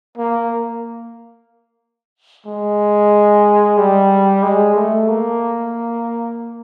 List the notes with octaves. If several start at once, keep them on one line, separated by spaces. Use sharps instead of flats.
A#3
G#3
G3
G#3
A3
A#3